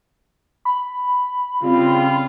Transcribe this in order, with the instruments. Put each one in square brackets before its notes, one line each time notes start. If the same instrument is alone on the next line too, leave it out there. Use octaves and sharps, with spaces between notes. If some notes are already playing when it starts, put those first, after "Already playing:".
[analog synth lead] B5
[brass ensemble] C#3 G3 F4 [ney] C4